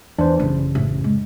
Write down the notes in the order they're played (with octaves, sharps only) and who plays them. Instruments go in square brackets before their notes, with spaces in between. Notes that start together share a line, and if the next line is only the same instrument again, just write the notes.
[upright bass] E2 [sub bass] E3 [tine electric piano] D4 C5
[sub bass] A1 [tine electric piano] F#2 C#3 [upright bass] E4
[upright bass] A2
G#3